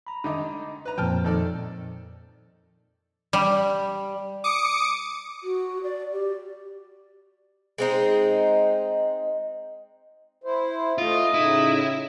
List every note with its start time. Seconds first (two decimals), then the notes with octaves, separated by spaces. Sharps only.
0.07 A#5 B5
0.24 D3 D#3 D#4
0.85 B4 A#5
0.98 F2 A#2 F3 G5 A5 F6
1.24 D#3 A4 D5
3.33 G3
4.44 D6 D#6 C#7
5.44 F#4
5.83 D5
6.12 G4
7.78 G#3 C4 D#4
10.44 E4 C5
10.98 A3 F4 D#5
11.34 A2 C#3 D#4 E4